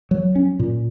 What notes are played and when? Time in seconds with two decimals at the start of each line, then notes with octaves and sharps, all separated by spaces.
0.11 F#3
0.35 C#4
0.59 A#2